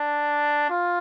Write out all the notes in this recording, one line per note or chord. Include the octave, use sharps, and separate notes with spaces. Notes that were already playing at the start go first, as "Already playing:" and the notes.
Already playing: D4
F4